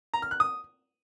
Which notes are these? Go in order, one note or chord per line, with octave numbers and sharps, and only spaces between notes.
A#5
F6
F#6
D#6